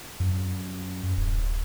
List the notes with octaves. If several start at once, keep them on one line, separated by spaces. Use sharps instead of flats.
F#2
D1